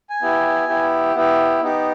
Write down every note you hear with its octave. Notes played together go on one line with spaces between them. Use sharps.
G#5
B3 E4 G4
B3 E4 G4
B3 E4 G4
B3 D#4 G4